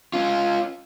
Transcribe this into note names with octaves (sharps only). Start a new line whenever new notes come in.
C#4 F4